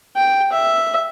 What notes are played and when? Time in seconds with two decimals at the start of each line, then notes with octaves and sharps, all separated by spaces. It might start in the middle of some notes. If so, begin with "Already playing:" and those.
0.16 G5
0.52 E5